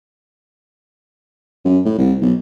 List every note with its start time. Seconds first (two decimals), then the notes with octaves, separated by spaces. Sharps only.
1.65 F#2
1.85 A2
1.98 C2
2.22 B1